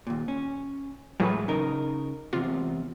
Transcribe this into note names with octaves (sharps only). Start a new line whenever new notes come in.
D#2 A#2
C#4
A2 E3 F#3 G#3 G#4 B4
C#3 D#4 A#4
E2 G#2 C3 F4